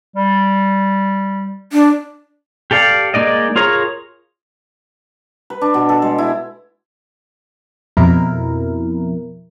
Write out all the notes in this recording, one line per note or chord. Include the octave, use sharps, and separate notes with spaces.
G3
D4
G4 A4 D5 F5
G#3 A#3 D#4 D5 D#5
F4 G#4 A#4 C#5 A#5
B4
D4
B2
A4
G#3
E4
F2 B2 E4 A#4